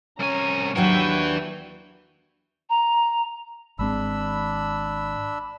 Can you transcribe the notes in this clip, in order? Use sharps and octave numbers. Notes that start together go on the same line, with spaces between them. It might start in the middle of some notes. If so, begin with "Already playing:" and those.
C2 C#4 G#5 A#5
D#2 F#3 D4 E4 B4 F#5 G5 C#6
A#5
G#1 G#3 C4 D4 B5 E6